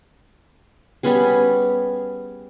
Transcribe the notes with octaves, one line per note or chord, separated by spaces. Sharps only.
G3 B3 C#4 G#4